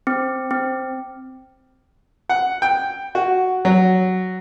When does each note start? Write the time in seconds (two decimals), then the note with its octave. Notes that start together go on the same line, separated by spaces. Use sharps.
0.07 C4
0.51 C4
2.29 F#5
2.62 G5
3.15 F#4
3.65 F#3